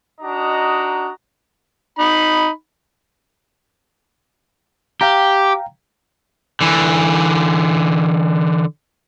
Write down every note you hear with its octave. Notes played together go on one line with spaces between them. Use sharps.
D4 D#4 F#4 D#5 A#5
D#4 B5
G4 F5 G5 A#5
D3 E3